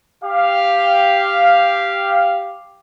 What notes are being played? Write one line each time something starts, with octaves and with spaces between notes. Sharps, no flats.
G4 F5